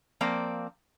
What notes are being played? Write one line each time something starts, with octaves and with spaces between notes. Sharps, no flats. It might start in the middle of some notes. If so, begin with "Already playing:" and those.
F3 A#3 C4 D5